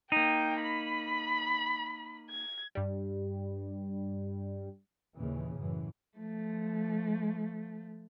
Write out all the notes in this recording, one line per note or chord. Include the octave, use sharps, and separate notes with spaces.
A#3 D#4 G5
B5
G#6
G2 G3
D#2 A#2 C#3 E3
F#2 A2 E3
F3 A3